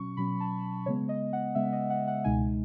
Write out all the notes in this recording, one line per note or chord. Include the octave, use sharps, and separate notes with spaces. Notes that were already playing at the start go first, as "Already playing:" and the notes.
Already playing: B2 F#3 C#4 C#6
B2 F#3 C#4 B5
A5
C#3 G#3 B3 C#5
D#5
F#5
C#3 G#3 B3 E5
D#5
F#5
F#5
C#2 B2 G#3 D#4 G#5